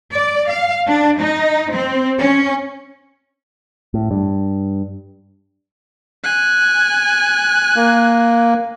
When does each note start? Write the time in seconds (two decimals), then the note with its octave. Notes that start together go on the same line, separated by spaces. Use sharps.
0.12 D5
0.50 F5
0.86 D4
1.20 D#4
1.71 C4
2.19 C#4
3.94 A2
4.11 G2
6.24 G#5 F#6
7.76 A#3